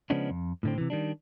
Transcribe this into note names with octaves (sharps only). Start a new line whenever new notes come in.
C#3 F3 G#3 B3 C#4 D4
F2
A2 D3 C4
C3 E3
D#3 G3 D4